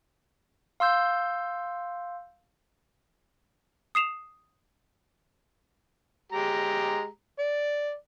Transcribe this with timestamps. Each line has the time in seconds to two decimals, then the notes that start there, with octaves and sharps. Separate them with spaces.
0.80 F5 C6 E6 G6
3.95 D#6 C7 E7 F7
6.32 G#3 G4 A#5
7.39 D5